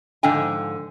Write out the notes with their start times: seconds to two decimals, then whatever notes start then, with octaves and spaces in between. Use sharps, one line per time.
0.23 G#2 D3 F3 G5 G#5